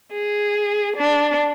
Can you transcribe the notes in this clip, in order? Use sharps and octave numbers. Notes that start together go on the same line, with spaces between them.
G#4
D4